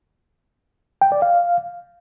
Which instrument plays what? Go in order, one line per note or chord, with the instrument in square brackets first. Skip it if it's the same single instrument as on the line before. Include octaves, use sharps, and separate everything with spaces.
[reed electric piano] G5
D5
F5